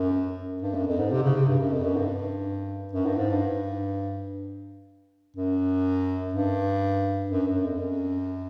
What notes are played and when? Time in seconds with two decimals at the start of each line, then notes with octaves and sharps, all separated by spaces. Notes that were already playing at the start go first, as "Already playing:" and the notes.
Already playing: F#2
0.62 G2
0.75 F#2
0.87 F2
0.99 G#2
1.11 C3
1.23 C#3
1.35 C3
1.48 G2
1.60 F#2
1.72 F2
1.84 F#2
1.96 G2
2.93 F#2
3.06 G2
3.18 G#2
3.30 G2
5.36 F#2
6.33 G2
7.31 F#2
7.47 F#2
7.64 F2
7.79 F#2